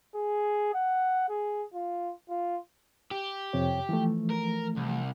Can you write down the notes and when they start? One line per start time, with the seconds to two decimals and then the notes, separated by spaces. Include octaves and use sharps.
0.15 G#4
0.75 F#5
1.29 G#4
1.74 F4
2.30 F4
3.11 G4
3.53 F2 C3 C#5
3.89 E3 F3 A3
4.30 A#4
4.77 C2